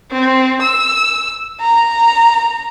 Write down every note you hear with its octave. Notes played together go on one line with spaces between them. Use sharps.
C4
E6
A#5